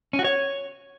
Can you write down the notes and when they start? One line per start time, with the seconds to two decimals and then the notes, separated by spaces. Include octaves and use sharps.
0.13 C#4
0.19 F#4
0.24 C#5